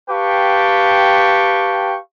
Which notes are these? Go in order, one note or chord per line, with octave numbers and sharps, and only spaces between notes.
G4 B4 F5 G5 A5 C#6